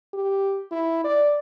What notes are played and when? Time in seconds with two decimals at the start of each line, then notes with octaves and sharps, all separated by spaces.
0.14 G4
0.72 E4
1.04 D5